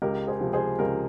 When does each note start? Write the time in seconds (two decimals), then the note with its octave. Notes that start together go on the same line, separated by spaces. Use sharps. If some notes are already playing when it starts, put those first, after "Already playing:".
0.02 C#2 G4 A#4
0.27 G#4 C5
0.41 C3 F3
0.53 G#4 C5
0.79 C#2 G4 A#4